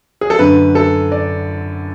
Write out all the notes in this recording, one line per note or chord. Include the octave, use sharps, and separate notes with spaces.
G#4
A4
F#2 D3 B4
A4
D5